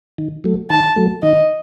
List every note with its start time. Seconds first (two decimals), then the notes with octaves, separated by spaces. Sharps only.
0.18 D#3
0.44 F#3 A3
0.70 D#3 A5
0.96 F#3 A3
1.23 D#3 D#5